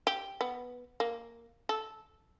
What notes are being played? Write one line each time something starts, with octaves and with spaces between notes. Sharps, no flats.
G4
B3
A#3
A4